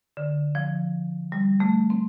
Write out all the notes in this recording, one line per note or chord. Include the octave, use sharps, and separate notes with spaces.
D3
F3
G3
A3
C4